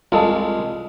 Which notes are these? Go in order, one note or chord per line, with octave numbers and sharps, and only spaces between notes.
C2 G#3 F4 A4